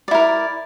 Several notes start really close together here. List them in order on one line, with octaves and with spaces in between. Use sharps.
D5 E4 A#4